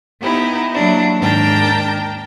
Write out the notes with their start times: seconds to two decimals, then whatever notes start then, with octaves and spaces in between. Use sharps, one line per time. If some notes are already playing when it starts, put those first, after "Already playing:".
0.21 B3 D#4 E4 G4
0.73 F#3 A#3 D4 E4
1.18 D#2 G#2 D4 A#4 G5 A5